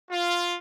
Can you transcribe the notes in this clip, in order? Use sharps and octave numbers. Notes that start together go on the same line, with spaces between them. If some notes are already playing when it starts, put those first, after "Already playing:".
F4